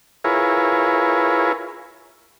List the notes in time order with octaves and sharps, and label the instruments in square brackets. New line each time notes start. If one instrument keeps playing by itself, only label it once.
[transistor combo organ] E4 F4 G#4 A#4 B4 C#5